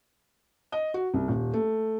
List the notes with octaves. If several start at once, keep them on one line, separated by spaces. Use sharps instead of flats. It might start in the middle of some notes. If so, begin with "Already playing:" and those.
D#5
F#4
C2
D#1
A3